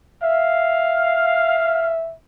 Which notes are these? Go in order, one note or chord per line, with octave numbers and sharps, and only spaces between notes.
E5 F5